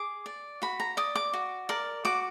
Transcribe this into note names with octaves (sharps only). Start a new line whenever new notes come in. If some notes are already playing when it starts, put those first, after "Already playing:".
Already playing: G#4 D6
D5
F#4 B5
A#5
D5 D#6
D6
F#4
A#4 D5
F#4 D6